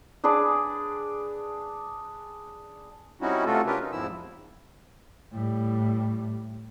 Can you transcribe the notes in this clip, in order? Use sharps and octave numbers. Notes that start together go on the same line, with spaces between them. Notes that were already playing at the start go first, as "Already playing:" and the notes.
D4 G#4 B4 D5
G3 C4 C#4 D#4 E4 F#4
C3 A3 F4 F#4 A4
C#4 D4 F4 G4 A#4 B4
D#4
E2 G#2 F3 C4 E4 E6
A2 G3